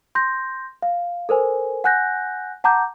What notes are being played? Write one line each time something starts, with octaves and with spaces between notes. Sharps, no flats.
C6 G6 A#6
F5
A4 A#4 C5 G#5
F#5 G#5 F#6 G6 A#6
F#5 A5 A#5 D6 G6